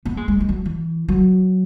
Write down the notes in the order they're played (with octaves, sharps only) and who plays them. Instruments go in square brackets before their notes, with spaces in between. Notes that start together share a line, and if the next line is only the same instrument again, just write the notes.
[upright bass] B3
G#3
G#3
G#3
F#3
E3
F#3